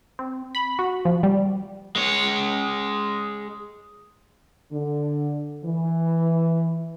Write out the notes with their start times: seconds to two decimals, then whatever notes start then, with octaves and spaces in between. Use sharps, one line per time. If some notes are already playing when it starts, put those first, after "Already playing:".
0.19 C4
0.55 B5
0.79 F#4
1.05 F3
1.23 G3
1.96 G#3 C#5
4.72 D3
5.65 E3